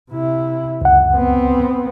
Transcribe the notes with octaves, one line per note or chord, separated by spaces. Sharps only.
C3 E4
C#2 F#2 F#5
B3 C4